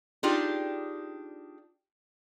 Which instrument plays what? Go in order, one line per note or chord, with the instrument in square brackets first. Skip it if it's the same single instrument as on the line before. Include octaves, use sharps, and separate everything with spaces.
[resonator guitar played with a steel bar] D4 D#4 F4 G4 G#4 D5